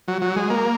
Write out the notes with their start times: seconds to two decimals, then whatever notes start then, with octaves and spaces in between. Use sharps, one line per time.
0.08 F#3
0.22 F#3
0.36 G#3
0.50 A#3